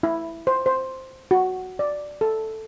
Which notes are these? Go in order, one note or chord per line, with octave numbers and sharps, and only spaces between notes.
E4
C5
C5
F#4
D5
A4